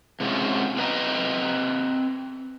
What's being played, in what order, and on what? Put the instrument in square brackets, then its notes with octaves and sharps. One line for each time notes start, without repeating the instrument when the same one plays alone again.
[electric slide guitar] C3 G#3 C#4 F4 F#4
C4 D4 B4 D#5 A#5